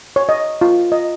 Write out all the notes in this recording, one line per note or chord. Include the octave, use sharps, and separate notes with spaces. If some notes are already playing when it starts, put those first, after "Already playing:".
C#5
D#5
F4
D#5